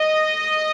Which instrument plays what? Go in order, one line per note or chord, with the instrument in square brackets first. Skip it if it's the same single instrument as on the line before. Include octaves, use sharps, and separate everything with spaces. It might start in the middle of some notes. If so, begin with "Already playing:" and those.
Already playing: [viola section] D#5